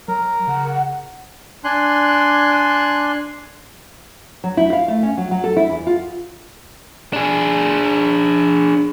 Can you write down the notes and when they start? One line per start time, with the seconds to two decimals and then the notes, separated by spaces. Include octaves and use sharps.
0.08 F#3 A#4
0.48 C#3 F#5
1.64 D4 G#5 C6 F#6
4.44 F#3
4.57 E4
4.73 F5
4.88 A3
5.03 C#4
5.17 F#3
5.31 F#3
5.44 A4
5.57 E4
5.70 E2
5.87 F4
7.13 D4 G#4